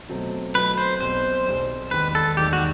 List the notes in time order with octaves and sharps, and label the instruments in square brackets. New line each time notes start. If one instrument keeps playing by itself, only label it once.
[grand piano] B2 F#3 A3 C4
[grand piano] B2 F#3 A3 C4 [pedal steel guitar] B4
[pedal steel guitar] C5
[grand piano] B1 B2 G3 C4 [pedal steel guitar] C5
[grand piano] B1 B2 G3 C4
[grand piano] E1 D#2 D#3 [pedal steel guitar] B4
[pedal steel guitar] A4
[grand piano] E1 D#2 D#3 [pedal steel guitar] G4
[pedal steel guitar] F#4